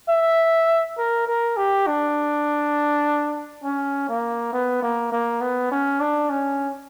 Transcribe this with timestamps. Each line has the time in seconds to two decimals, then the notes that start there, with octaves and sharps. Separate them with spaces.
0.09 E5
0.98 A#4
1.27 A#4
1.57 G4
1.87 D4
3.64 C#4
4.09 A#3
4.53 B3
4.82 A#3
5.12 A#3
5.41 B3
5.71 C#4
6.00 D4
6.30 C#4